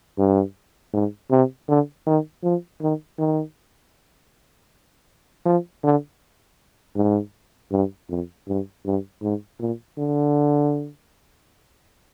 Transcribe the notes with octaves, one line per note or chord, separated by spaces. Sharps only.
G2
G#2
C3
D3
D#3
F3
D#3
D#3
F3
D3
G#2
G2
F2
G2
G2
G#2
A#2
D3